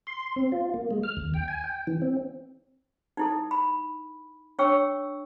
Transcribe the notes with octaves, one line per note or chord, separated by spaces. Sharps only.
C6
C4
F4
A#3
G#3
F6
D#2
G5
G#5
G5
E3
C4
D#4 E4 A4
B5
D4 C#5 G5 C#6 E6